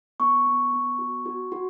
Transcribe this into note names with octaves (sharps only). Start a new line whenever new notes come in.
B3 C#6
B3
B3
F#4
F#4
F#4